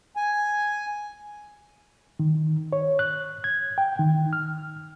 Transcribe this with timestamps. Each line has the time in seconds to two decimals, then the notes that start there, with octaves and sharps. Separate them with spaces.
0.16 G#5
2.20 D#3
2.73 C#5
2.99 F#6
3.44 G#6
3.78 G5
3.99 D#3
4.33 F6